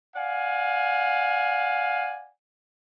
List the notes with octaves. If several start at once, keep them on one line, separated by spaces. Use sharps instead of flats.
D5 F5 F#5 G#5